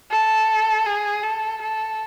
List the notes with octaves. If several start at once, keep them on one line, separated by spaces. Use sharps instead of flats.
A4
G#4
A4
A4